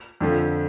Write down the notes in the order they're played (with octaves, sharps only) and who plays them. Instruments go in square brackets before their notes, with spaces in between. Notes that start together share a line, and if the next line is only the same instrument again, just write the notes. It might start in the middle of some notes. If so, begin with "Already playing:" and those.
[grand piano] F2 D3 F3